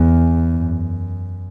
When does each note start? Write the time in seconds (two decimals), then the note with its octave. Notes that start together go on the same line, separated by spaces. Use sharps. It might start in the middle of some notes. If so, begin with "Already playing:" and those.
Already playing: E2
0.52 F#2